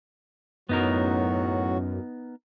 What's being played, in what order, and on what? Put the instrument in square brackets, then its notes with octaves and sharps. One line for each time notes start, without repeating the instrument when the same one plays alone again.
[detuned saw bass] F#2 [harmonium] A2 F#3 F#4 [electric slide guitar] B3 D#4 A#4